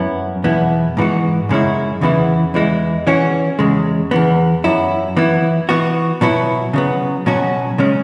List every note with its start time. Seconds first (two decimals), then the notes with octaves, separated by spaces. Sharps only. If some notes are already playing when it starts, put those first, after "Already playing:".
Already playing: F#2 F#3 B3 E4
0.44 E2 B2 B3 E4
0.97 G#2 E3 B3 F#4
1.49 F#2 C#3 G#3 C#4 E4
2.01 E2 C#3 E3 B3 E4
2.54 E2 E3 G#3 E4
3.07 E3 C#4 F#4
3.59 E2 C#3 G#3
4.11 E2 E3 B3
4.64 F#2 F#3 E4
5.17 E3 B3 E4
5.69 E3 B3 F#4
6.21 B2 F#3 B3 E4
6.73 C#3 F#3 B3
7.26 B2 F#3 C#4 F#4
7.78 C#3 G#3 C#4